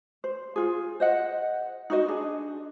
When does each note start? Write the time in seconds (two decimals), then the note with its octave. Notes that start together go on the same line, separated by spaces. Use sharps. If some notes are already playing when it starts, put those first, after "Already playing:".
0.24 C5
0.56 F4 G#4
1.00 C5 D#5 F#5
1.90 D#4 F#4 C5 D#5
2.08 D4 G#4